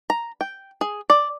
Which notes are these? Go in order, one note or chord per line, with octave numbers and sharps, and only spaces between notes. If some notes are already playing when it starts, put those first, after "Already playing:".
A#5
G5
G#4
D5